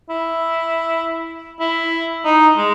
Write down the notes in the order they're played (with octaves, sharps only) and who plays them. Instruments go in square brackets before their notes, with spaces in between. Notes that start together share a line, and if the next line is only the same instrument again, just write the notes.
[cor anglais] E4
E4
D#4
G#3